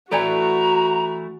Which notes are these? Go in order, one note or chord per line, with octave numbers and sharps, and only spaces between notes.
E3 A3 E4 F#4 A4 D5 G#5 A#5